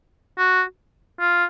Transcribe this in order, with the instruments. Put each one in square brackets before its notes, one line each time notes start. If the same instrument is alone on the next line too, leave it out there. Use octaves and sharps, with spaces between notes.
[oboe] F#4
F4